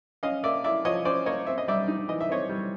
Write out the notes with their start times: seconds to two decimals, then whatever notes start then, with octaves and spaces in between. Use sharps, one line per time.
0.23 C#4 D#5 F5
0.44 A#3 D5 E5
0.64 E4 D5 E5
0.85 F3 C#5 D#5
1.05 C#4 C5 D5
1.26 A#3 C#5 D#5
1.47 C4 E5
1.58 D#5
1.68 G3 D5 E5
1.88 D#4
2.08 E3 D#5
2.21 E5
2.29 C4 C#5 D#5
2.49 G3